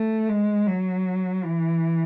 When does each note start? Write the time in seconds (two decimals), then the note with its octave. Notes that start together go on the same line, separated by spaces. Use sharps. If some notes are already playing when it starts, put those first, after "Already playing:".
Already playing: A3
0.29 G#3
0.67 F#3
1.45 E3